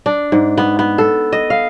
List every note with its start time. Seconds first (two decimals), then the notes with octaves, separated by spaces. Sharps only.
0.06 D4
0.32 G#2
0.57 B3
0.79 B3
0.98 A4
1.32 D#5
1.50 F5